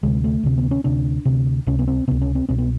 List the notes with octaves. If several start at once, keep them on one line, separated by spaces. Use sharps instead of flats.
D2 C3 G#3
A3
D2 C3
B3
C#4
D2 C3 D4
D2 C3
C#2 C3 C#4
B3
C4
C#2 C3 B3
C#4
C4
C2 B2 C4
B3